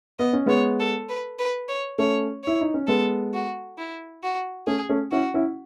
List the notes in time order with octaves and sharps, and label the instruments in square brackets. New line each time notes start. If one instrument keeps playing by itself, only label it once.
[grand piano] B3 [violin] D#5
[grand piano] C#4
[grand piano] G#3 B3 [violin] C#5
[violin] A4
B4
B4
C#5
[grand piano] A3 C#4 [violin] C#5
[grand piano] E4 [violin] C#5
[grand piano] D#4
C#4
[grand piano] G#3 B3 [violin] A4
[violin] F#4
E4
F#4
[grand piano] A3 C#4 [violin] G#4
[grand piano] A3 C#4
[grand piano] C#4 E4 [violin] F#4
[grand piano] C#4 E4